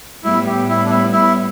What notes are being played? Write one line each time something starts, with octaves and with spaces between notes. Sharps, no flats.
A2 G3 B3 E4
G4
E4
D4
E4
E4